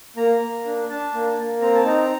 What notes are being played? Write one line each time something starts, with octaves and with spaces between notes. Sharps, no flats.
A#3 A#5
A#3
D4
D4 A5
A#3
A#3
C4 A#5
A5
D#4 A#5